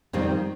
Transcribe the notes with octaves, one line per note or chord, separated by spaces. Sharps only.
F2 D#3 G3 C4